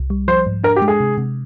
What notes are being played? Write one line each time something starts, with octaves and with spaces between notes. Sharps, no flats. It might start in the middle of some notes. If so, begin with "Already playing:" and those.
Already playing: C2
G3
F3 C5
G#2
D4 A#4
G4
G#3
G#4
C3
C3